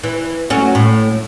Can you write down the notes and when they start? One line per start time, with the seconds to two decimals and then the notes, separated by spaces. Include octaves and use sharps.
0.03 E3
0.50 F#3 A3 C#4
0.75 A2